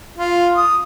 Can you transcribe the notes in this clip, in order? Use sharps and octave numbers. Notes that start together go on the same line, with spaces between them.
F4
D#6